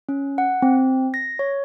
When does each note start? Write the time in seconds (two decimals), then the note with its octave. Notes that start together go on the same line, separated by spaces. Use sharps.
0.09 C#4
0.38 F#5
0.62 C4
1.14 A#6
1.39 C#5